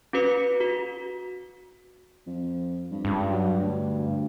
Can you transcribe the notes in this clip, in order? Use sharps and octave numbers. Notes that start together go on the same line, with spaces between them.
C#4 F#4 B4 C#7
F#4
F2
G2
C#2 G2
F#3
D2